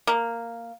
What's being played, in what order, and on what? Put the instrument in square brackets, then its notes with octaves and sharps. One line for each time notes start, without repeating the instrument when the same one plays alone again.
[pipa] A#3